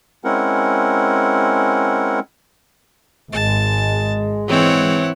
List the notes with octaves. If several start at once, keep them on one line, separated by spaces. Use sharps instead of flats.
G#3 C4 C#4 E4 A#4 F#5
G#1 G#3 A5
E3 C4 E4 C#5 F#5